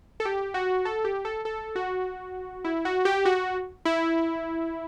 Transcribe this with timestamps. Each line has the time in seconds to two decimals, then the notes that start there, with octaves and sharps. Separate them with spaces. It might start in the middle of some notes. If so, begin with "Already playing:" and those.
0.20 A4
0.25 G4
0.54 F#4
0.85 A4
1.05 G4
1.25 A4
1.45 A4
1.76 F#4
2.65 E4
2.85 F#4
3.05 G4
3.25 F#4
3.85 E4